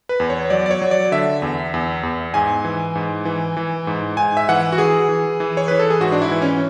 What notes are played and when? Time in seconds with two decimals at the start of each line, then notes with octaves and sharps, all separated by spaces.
0.09 B4
0.20 E2
0.30 C#5
0.50 F#3 D5
0.66 D5
0.71 C#5
0.82 F#3
0.91 D5
1.12 D3 E5
1.42 E2
1.74 E2
2.03 E2
2.34 G#2 G#5
2.65 E3
2.95 G#2
3.25 E3
3.57 E3
3.87 G#2
4.17 G#2 G#5
4.37 E5
4.49 E3 F#5
4.72 F#4
4.78 E3 G#4
5.09 E3
5.40 E3
5.57 C#5
5.68 E3 B4
5.79 A4
5.90 G#4
6.00 G#2 F#4
6.12 D4
6.22 E4
6.32 E3
6.42 C#4